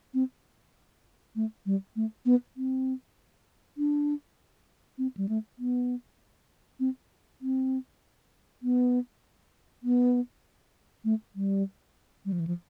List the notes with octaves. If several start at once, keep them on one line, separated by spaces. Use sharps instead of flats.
C4
A3
G3
A3
B3
C4
D4
C4
G3
A3
B3
C4
C4
B3
B3
A3
G3
G3
F3
E3
F3